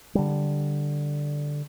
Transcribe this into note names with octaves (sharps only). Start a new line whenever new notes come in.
D3 G3